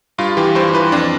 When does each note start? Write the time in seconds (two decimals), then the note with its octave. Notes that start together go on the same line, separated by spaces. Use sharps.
0.18 G2 F4
0.37 E3 G4
0.55 G2 C5
0.74 E3 B4
0.92 F2 D4